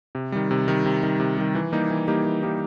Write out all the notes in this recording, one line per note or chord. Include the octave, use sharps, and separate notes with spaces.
C3
D#3 G3
C3
D#3 G3
C3
D#3 G3
C3
D#3 G3
E3
G3 A#3 D#4 G4
E3
G3 A#3 D#4 G4
E3
G3 A#3 D#4 G4